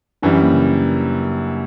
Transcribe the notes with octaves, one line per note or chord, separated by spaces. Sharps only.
F#2 E3 G3 D4
C#4
A#3
C#3